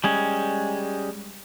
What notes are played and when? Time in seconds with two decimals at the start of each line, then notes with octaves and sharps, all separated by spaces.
0.04 G3 G#3 C#4